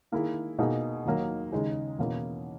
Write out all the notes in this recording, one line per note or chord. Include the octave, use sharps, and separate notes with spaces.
D#3 A#3 E4 G#4
B2 A#3 D#4 G#4
D#2 D#3 F#3 A#3
D#2 C#3 G#3 D#4 G#4
E2 B2 A#3 C#4 E4